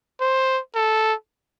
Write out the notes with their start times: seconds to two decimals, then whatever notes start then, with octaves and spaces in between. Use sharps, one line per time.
0.21 C5
0.75 A4